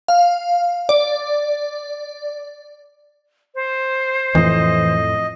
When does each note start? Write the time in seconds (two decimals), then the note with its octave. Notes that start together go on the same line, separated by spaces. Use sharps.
0.08 F5
0.89 D5
3.55 C5
4.35 F2 A2 E3 D#5